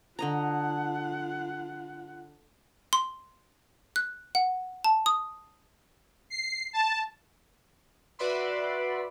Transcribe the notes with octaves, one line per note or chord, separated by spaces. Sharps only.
D3 F4 D#5 F#5 A#5
C6
F#6
F#5
A5
D#6
C7
A5
F#4 B4 D5 E5 B5 C6